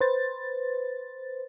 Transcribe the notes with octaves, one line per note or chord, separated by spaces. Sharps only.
B4 C5 A6